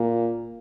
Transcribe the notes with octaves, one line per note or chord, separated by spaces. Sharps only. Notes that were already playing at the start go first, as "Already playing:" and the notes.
Already playing: A#2